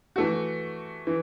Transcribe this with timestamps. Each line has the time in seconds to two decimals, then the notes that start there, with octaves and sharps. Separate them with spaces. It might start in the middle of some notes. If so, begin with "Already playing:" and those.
0.16 E3 A3 F#4
1.07 E3